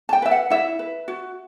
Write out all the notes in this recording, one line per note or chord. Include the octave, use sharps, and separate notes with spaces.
A5
G5
B4 E5
F#5
E4 E5
B4
F#4